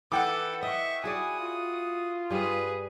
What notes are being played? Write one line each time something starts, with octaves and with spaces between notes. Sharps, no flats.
E3 A4 B4 F#5 G5 D6
D#5 E5 C#6
E4 F#4 G#4 D5 G#5 D#6
F4
G2 G3 G#4 B4